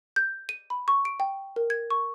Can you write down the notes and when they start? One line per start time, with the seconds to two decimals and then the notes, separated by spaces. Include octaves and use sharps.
0.16 G6
0.49 D#7
0.70 B5
0.88 C#6
1.05 D7
1.20 G5
1.56 A#4
1.70 G#6
1.90 C#6